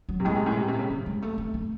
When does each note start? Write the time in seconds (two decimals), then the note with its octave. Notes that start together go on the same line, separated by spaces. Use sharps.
0.09 F#3
0.20 C3
0.25 A2 G#3
0.36 C3
0.46 A2
0.57 C3
0.68 C3
0.79 C#3
0.90 F#3
1.06 G#3
1.22 A3
1.38 C4
1.54 A3